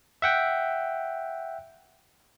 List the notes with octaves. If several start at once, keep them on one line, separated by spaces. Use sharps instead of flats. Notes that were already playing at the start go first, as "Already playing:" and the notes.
E5 F#5 G5